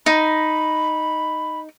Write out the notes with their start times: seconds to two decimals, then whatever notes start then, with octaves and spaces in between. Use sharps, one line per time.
0.06 D#4 B5